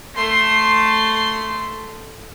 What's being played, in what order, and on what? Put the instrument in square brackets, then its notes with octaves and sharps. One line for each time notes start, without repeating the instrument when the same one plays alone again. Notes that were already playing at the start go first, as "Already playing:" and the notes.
[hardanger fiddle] A3 C6